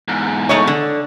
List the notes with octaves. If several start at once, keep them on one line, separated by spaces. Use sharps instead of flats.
E2 G#2
A3 D#4 C#5
D3